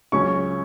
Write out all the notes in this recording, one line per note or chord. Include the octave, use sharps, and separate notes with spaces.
C#2 C#3 F#3 C#4 C#6